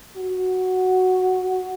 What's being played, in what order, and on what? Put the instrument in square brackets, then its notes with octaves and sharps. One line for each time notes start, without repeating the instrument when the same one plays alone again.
[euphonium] F#4